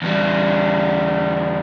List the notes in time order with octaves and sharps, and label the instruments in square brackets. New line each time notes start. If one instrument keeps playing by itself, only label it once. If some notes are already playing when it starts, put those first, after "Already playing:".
[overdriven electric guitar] E2 G3